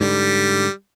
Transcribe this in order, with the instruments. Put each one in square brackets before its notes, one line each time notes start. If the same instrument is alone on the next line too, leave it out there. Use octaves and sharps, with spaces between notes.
[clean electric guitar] G#2 D3 [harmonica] G3